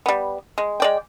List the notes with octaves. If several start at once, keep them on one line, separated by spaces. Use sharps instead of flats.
G3 B3
G#3
G#3 D5 G5